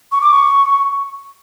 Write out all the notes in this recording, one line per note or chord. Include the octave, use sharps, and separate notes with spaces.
C#6
D6
C#6